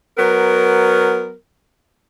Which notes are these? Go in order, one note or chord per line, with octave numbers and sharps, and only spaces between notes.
F#3 B3 A#4